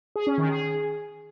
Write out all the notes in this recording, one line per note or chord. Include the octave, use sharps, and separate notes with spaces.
G#4
C#4
D#3
G#4